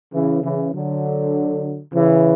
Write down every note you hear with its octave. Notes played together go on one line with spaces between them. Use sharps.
C#3 E3
C#3 E3
D3 F#3
C#3 E3